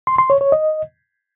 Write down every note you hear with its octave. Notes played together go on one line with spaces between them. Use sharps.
C6
C6
C#5
C#5
D#5